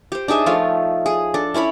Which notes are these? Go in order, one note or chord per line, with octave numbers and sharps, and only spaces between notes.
G4 C5
D4 D#4 G#4 E5
F3 A3 F4 C#5
G#4
D4 A4
C#4 E4 C#5 B5